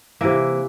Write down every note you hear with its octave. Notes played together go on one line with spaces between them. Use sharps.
C3 E3 A#3 E5